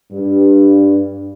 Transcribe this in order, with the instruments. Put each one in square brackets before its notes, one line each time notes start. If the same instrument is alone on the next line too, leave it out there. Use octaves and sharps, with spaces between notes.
[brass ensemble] G2